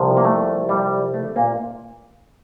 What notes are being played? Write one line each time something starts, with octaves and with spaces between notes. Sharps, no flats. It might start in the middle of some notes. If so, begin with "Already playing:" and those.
Already playing: C2 C3 F3
A#3
A3
G3
A3
A#2 A#3